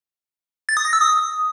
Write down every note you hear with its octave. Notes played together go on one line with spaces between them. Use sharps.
A6
D#6
A#6
E6
D#6